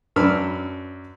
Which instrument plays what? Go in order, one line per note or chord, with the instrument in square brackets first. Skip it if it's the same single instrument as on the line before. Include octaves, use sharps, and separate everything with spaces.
[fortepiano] F#2 D4 B4 B5 E6 F6